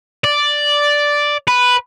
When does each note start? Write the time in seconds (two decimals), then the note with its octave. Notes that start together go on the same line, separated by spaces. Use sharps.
0.24 D5
1.48 B4